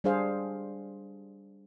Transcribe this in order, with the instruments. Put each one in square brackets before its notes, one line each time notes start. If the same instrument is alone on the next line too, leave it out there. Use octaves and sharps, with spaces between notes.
[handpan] G3 D4 G#4 C5 F5